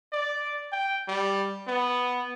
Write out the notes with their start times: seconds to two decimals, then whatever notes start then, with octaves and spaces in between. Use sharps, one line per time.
0.12 D5
0.72 G5
1.08 G3
1.68 B3